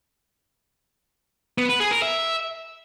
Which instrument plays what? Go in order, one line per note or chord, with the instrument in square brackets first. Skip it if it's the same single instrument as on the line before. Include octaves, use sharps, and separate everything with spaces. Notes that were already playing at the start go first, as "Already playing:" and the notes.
[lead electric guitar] B3
B4
G#4
A#4
E5